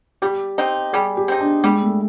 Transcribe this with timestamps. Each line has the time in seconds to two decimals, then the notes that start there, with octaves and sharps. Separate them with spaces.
0.22 G3 G4
0.58 C4 D#4
0.93 G3 G#4
1.17 G4
1.28 C4 D#4
1.40 D4
1.64 G3 G#3
1.82 A3